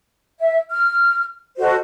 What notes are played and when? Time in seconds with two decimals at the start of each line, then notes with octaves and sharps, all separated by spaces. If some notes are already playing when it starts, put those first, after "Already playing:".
0.39 E5
0.69 F6
1.59 F#4 A4 C5 D#5